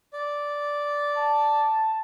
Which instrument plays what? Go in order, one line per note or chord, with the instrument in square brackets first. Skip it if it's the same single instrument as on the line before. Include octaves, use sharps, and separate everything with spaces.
[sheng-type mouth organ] D5
[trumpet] A5